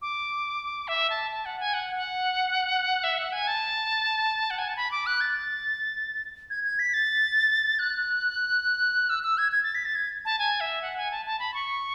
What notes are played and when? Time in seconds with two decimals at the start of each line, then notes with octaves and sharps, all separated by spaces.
0.02 D6
0.88 E5
1.10 A5
1.31 A5
1.45 F#5
1.60 G#5
1.74 F#5
1.96 F#5
3.04 E5
3.18 F#5
3.33 G#5
3.47 A5
4.50 F#5
4.59 G#5
4.68 A5
4.77 B5
4.91 D6
5.06 F#6
5.21 A6
6.50 G#6
6.64 G#6
6.79 B6
6.94 A6
7.79 F#6
9.09 E6
9.23 E6
9.38 G#6
9.52 G#6
9.63 A6
9.75 B6
9.85 A6
9.95 G#6
10.25 A5
10.39 G#5
10.60 E5
10.82 F#5
10.97 G#5
11.11 A5
11.26 A5
11.39 B5
11.54 C#6